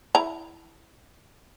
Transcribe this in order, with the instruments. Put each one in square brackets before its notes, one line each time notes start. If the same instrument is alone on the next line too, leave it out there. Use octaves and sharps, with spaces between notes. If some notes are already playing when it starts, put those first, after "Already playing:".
[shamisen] E4 A#5